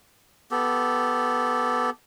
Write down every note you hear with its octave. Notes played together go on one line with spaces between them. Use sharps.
B3 G4 A4